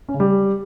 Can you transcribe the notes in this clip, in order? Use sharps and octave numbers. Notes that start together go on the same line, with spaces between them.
C#4
C#3
G3